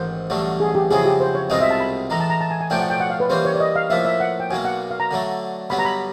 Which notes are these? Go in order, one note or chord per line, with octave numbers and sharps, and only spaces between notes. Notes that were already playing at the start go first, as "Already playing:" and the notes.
Already playing: A1 G#2 D#3 C5
A1 G2 D3 F#3 A3
G#4
G4
F2 C#3 F#3 B3 E4 G#4
G4
C5
C#5
C2 B2 G#3 C4 F4 D#5
E5
A5
B5
A2 E3 G#3 A#5
A5
A#5
A5
G#5
G#5
B1 A2 F3 A3 D4 G5
F#5
G5
F#5
F5
B4
E3 G3 A#3 C#4 C5
C#5
D5
D#5
F5
A2 F3 A#3 E5
E5
F#5
G5
B1 B2 F#3 A#3 G#5
F#5
F5
A#5
D3 F#3 A3
G2 D3 F#3 B3 B5
A#5
B5